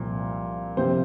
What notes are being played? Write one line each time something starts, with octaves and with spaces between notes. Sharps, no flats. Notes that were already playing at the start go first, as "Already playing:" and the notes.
Already playing: C2 A#2 F3
C3 F3 C5